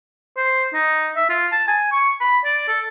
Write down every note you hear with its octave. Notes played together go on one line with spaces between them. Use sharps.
C5
D#4
E5
F4
A5
G#5
C#6
B5
D5
A4